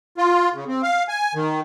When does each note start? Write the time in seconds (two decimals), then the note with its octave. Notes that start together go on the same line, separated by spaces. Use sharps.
0.18 F4
0.54 C#3
0.68 C4
0.83 F5
1.09 G#5
1.35 D#3